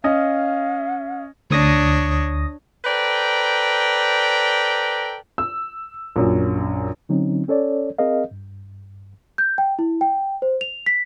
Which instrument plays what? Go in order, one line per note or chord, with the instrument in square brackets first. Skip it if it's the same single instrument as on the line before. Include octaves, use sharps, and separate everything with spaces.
[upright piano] C#4 D#5 [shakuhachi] F5
[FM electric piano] D2 D#6 A#6 [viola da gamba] D4 C#5
[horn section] A4 B4 C5 D5 G5 A#5
[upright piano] E6
A#1 F#2
[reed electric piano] D3 F#3 C4 C#4 D#4
C#4 A4 C#5 D5
C4 G#4 A#4 D#5 F5
G2
[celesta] G6
G5
E4
G5
C5
F7
B6